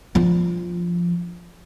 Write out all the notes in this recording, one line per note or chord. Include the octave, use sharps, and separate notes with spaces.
F3 D4